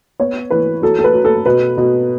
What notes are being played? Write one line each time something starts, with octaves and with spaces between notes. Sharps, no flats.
B3 C#5
E3 B4
F#3 A4
A4
B4
F#3
A4
B2 B4
B2